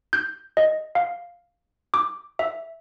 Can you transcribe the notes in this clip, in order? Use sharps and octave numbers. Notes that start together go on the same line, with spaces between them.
G6
D#5
F5
D6
E5